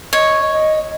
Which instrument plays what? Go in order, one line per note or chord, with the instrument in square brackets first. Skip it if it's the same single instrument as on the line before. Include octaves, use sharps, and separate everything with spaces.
[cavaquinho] C#5 [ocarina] D#5
[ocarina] D#5